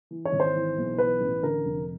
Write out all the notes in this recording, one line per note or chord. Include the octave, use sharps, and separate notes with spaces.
E3
C#5
G#1
C5
E3
B1
E3 B4
A1
D3 A#4
F1